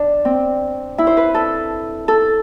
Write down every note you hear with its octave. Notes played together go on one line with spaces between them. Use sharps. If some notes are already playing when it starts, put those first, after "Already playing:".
Already playing: D4
C4
E4
C5
B4
A4
A4